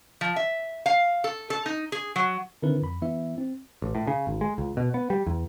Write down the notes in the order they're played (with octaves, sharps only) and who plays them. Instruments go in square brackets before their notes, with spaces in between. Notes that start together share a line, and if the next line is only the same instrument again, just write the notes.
[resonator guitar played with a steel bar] F3
E5
F5
A4
A4
D#4
G#4
F#3
[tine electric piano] D3 D#3 C4 E4 A#4 B4
F2 B5
E3 B3 E4 E5
C4
[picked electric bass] A1
A2
C#3
G#1
G#3
C#2
B2
B3
G3
E2